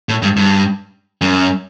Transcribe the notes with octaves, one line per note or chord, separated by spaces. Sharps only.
A2
G2
G2
F#2